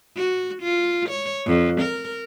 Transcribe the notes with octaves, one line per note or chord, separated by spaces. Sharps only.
F#4
F4
C#5
F2
A#4